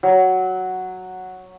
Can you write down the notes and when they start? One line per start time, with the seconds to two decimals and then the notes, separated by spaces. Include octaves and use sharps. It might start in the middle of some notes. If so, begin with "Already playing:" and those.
0.03 F#3